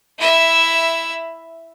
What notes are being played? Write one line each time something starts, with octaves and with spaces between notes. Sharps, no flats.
E4 E5